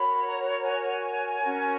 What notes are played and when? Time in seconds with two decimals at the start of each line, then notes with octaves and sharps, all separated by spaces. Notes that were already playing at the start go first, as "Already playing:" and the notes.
Already playing: F#4 A#4 C#5 B5
0.26 A#5
0.64 G#5
1.41 C#4 F#4 A#4